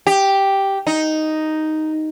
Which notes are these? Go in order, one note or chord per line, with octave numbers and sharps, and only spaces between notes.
G4
D#4